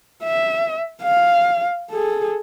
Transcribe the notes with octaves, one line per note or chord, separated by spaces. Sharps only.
E5
F5
G#4 A4